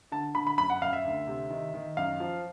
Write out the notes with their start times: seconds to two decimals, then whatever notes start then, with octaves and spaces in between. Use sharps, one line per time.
0.12 D3 A5
0.35 D3 B5
0.47 B5
0.58 F#2 B5
0.70 F#5
0.82 F#2 F5
0.93 E5
1.05 D2
1.28 C3
1.51 D#3
1.74 D#3
1.97 F#2 F5
2.20 F3